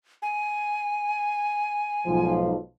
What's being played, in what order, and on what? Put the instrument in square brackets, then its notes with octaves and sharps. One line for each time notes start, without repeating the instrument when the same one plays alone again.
[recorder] G#5
[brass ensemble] B1 G#2 F3